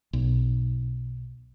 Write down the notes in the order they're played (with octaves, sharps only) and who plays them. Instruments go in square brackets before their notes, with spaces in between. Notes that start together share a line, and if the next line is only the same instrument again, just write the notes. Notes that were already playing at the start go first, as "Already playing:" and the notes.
[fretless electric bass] B1